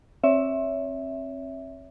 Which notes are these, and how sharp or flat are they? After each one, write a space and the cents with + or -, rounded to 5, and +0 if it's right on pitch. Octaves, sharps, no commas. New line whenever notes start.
C4 +35 C#5 +35 E5 +0